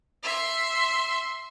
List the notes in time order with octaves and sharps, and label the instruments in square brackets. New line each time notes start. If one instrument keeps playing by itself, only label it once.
[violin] E5 C6